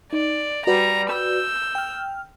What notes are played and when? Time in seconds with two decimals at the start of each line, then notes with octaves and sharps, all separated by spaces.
0.13 D#4 D5
0.67 G3 F#4 B4 D5 A#5
1.12 E6 G6
1.75 G5 F6